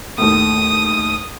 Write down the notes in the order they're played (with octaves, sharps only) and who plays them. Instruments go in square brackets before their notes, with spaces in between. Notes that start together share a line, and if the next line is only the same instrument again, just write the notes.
[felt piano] D#2 A2 [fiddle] D#6